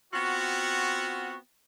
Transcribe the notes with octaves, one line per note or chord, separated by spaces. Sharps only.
B3 C4 F4 F#4